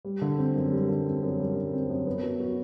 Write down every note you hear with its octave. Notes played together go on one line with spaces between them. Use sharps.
G3
D3
C4
F#2
G3
D3
C4
F#2
G3
D3
C4
F#2
B3
F#3
F#4